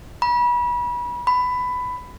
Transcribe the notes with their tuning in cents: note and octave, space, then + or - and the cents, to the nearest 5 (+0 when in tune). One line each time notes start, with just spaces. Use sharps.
B5 -30
B5 +15